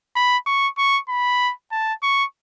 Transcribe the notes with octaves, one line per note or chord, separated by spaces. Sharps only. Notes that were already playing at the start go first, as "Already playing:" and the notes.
B5
C#6
C#6
B5
A5
C#6